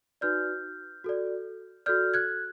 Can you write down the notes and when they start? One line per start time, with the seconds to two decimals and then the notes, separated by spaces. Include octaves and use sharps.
0.21 D#4 F#4 B4 D5 F6 G6
1.04 F#4 A4 D5
1.86 F#4 A4 D5 F6 G6
2.14 F#6 G#6